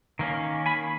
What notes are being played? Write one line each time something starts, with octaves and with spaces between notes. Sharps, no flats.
D#3 A#3 C#4
G#5 B5